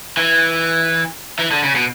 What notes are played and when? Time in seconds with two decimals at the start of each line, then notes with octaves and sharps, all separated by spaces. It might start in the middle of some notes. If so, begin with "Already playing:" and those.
0.17 E3
1.39 E3
1.51 D3
1.63 C#3
1.76 B2